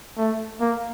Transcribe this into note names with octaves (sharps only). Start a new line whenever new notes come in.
A3
A#3